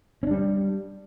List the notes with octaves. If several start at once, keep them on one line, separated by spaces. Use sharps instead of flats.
G3 C#4 D4